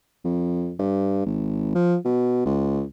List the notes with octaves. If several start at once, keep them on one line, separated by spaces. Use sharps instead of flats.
F2
G2
G#1
F3
B2
C#2